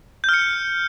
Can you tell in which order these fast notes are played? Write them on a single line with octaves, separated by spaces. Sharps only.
G6 F6 C#7